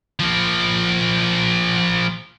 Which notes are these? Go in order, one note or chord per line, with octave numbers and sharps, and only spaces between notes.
F3 A#3